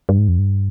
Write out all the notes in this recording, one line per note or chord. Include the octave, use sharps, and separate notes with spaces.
G2
G#2
F2
G2